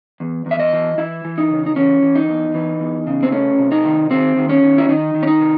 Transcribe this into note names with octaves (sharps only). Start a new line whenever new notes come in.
E2
E2
E5
D#5
E3
E3 E4
E3
D#4
C#3
D#4
E3 C#4
E3
D#4
E2
E3
E2
C#3
C4
A3 C#4
C3
D#4
D#3
D#3 C4
D#3
C#4
D#3
E4
D#3 D#4
D#3
C#4
D#4
C3